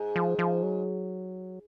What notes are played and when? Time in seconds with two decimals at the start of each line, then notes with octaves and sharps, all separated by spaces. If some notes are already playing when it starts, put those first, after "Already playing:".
Already playing: G#2
0.16 F3
0.39 F3
0.63 F#3